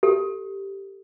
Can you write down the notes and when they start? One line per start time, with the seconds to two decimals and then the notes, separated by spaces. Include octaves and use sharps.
0.03 G4 A4